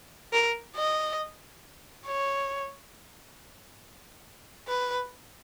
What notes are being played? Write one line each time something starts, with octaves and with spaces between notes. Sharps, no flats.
A#4
D#5
C#5
B4